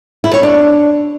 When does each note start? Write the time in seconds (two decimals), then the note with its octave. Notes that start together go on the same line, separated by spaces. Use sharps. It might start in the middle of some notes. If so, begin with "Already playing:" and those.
0.24 E4
0.34 C#5
0.43 D4